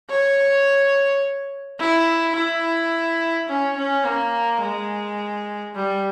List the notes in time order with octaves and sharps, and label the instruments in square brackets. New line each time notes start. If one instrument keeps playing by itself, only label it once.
[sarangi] C#5
E4
E4
C#4
C#4
A#3
G#3
G3